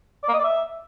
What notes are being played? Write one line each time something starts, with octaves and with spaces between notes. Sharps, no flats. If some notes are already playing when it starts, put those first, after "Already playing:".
D5
A#3
D#5
D5
E5